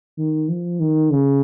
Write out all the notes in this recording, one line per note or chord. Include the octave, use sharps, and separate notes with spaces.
D#3
F3
D#3
C#3